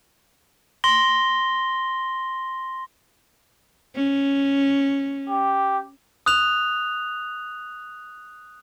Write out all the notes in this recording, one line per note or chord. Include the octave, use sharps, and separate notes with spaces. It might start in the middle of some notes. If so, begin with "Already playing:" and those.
C6 A#6 G7
C#4
G4
D#6 F#6 F7